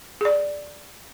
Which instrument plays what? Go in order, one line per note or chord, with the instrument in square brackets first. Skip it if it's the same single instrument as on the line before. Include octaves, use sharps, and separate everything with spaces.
[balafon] G#4 D5